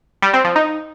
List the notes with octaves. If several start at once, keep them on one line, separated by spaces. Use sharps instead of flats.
G3
C4
F3
D#4